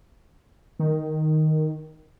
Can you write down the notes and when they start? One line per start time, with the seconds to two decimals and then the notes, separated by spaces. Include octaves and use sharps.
0.79 D#3